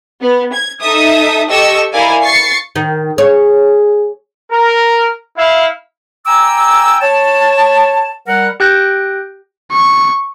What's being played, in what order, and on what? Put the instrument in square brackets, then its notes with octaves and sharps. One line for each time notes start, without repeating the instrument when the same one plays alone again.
[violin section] B3
G#6
D#4 A4 E5 D#6
G4 A4 D#5 C#6 E6
E4 A#4 D5 F5 G#5
C#6 A6 C7 C#7
[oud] D#3
[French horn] G#4 [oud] C#5
[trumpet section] A#4
E4 F5
[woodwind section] G5 G#5 A#5 D6 E6
C#5 A5
G3 A#4 F#5
[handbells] G4 G5 F#6 G6 A#6 D7
[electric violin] C#6